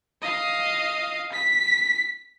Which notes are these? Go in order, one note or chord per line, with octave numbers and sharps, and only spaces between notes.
D#5 F5
B6